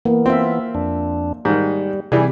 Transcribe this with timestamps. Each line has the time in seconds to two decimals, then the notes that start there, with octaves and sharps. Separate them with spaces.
0.05 E3 A#3 B3
0.26 C4 F4 E5
0.75 F2 D4
1.45 G#2 D#3 G3
2.12 C3 E3 G3 G#4